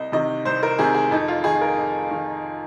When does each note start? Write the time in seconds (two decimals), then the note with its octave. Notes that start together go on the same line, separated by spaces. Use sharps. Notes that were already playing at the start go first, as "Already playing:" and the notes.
Already playing: C2 D#5
0.12 C3 D#3 D#5
0.45 C2 C5
0.63 A#4
0.79 C3 D#3 G#4
0.94 G#4
1.11 F2 D#4
1.28 F4
1.44 D#3 G#4
1.61 A#4
1.78 F2
2.11 D#3